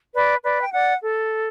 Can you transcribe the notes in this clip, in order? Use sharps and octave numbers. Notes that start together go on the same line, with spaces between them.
B4 D5
B4 D5
G5
D5 F#5
A4